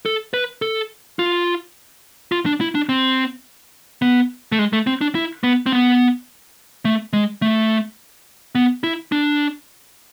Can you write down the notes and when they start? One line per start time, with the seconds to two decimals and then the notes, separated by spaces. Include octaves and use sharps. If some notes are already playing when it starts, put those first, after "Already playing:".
0.06 A4
0.34 B4
0.62 A4
1.19 F4
2.32 F4
2.46 D4
2.61 E4
2.75 D4
2.89 C4
4.02 B3
4.52 A3
4.59 G#3
4.73 A3
4.87 C4
5.01 D4
5.15 E4
5.43 B3
5.66 C4
5.72 B3
6.85 A3
7.13 G#3
7.42 A3
8.55 B3
8.84 E4
9.12 D4